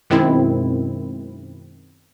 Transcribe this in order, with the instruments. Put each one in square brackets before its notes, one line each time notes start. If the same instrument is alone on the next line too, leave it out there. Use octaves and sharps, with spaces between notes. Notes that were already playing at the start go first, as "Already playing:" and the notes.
[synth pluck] F#2 B2 D#3 G#3 C4 E4